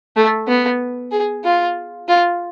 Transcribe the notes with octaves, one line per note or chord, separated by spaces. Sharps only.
A3
B3
G#4
F4
F4